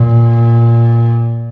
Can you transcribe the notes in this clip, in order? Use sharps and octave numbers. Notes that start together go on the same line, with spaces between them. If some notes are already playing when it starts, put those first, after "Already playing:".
Already playing: A#2